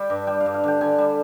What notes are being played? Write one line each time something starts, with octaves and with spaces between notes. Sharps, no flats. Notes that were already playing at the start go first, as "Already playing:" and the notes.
Already playing: G3 G5
G2
G3 G5
F5
G2
F5
D3 G5
D3 G#5
G3